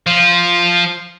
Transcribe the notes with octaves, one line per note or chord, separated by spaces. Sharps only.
F3 F4